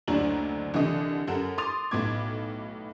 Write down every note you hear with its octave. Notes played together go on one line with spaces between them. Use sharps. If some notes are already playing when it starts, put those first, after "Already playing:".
F#1 D2 F#3 D4 A#5 F#7
C2 D3 E3 D#5 D#6
F#2 A4 A#4 F#5 E7
C6 D6 D#6 A6 F7
B1 A2 B3 D6 G#6